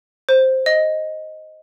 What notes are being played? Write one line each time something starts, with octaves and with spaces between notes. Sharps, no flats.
C5
D#5